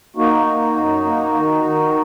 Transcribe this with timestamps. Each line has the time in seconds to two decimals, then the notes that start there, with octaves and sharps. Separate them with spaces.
0.16 A#3 D#4 F#4
0.46 A#3
0.76 F#2
1.05 A#3
1.34 D#3
1.64 D#3